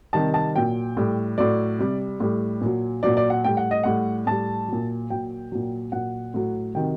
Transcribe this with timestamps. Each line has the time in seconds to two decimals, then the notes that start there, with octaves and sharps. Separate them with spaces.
0.13 C3 D#3 G3 A5
0.34 A5
0.55 A#2 F#3 G5
0.97 A2 G3
1.38 A2 F#3 D5
1.79 C3 G3
2.20 A2 G3
2.61 A#2 F#3
3.03 A#2 F#3 D5
3.17 D5
3.30 F#5
3.44 A2 G3 G5
3.57 F#5
3.71 D#5
3.83 A2 G3 F#5
4.27 A2 G3 A5
4.68 A#2 F#3
5.10 A#2 F#3 G5
5.52 A#2 F#3
5.92 A#2 F#3 F#5
6.34 A2 F#3
6.75 C3 D#3 F#3 G5